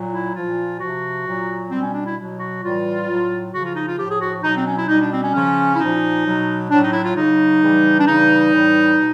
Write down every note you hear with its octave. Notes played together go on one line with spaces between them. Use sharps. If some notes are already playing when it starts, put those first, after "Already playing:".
Already playing: A#2 F#3
E4
A#2 F3 F4
C3 F3 F#4
A#2 F#3
B2 G3 C4
C#4
D4
E4
B2 F#3
F#4
A2 E3 G3 F4
A2 F#3
C#3 F3 F#4
F4
D#4
F4
A2 F3 G4
G#4
F#4
B2 F#3 D#4
C4
C#4
E4
B2 G3 D#4
D4
C4
C#4
C#3 F3 C#4
E4
A#2 F3 D#4
B2 F#3
A2 F#3 D4
D#4
E4
F4
C#3 F#3 D#4
C#3 E3 G3
D4
C#3 E3 G3 D#4
A2 E3 G3
B2